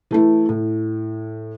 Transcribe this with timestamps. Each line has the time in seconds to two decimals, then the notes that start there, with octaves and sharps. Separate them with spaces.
0.11 E3 A3 E4
0.49 A2